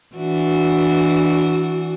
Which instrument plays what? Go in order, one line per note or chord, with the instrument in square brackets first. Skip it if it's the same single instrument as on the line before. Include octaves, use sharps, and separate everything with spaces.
[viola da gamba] E3 D4 F#4